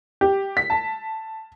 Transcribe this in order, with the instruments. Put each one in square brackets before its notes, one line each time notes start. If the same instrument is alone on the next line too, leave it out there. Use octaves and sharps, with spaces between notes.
[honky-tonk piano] G4
B6
A5